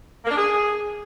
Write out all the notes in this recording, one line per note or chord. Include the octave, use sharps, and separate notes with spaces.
A#3
D4
G#4